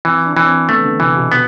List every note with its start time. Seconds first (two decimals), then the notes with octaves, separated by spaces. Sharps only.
0.05 E3 C4
0.26 D4
0.37 E3
0.47 C4
0.68 A3 B3
0.78 E3
0.84 D3
1.00 C3 E3
1.16 B2
1.32 B2 B3